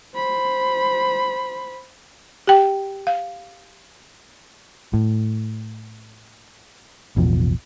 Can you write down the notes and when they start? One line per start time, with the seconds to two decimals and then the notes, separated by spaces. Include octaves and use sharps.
0.15 C5 B5
2.47 G4 G5
3.07 F5
4.94 A2
7.17 A1 E2 B2 F3